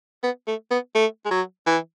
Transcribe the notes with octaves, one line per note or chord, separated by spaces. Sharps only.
B3
A3
B3
A3
G#3
F#3
E3